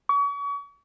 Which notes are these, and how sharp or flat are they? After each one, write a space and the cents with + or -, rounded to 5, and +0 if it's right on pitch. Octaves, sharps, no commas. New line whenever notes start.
C#6 +40